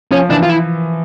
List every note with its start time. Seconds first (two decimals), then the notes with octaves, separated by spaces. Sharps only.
0.11 F3 C#4
0.30 E3 D4
0.43 F4
0.49 E4